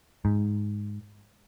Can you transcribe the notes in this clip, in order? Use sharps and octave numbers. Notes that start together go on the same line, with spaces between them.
G#2